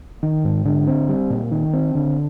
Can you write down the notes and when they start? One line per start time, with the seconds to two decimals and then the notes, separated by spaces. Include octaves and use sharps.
0.23 D#3
0.45 G#2
0.65 D3
0.87 C4
1.09 G3
1.30 A#2
1.51 D#3
1.73 C4
1.95 D3